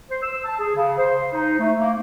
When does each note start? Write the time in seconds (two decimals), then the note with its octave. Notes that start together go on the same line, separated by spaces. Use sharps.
0.10 C5
0.22 E6
0.45 A5
0.59 G#4
0.75 C#3
0.98 C5
1.34 D#4
1.59 A3
1.78 A#3